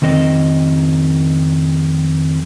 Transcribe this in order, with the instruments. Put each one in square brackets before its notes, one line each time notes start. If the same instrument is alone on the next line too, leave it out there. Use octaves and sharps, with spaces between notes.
[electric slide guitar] F2 D#3 C4 D#5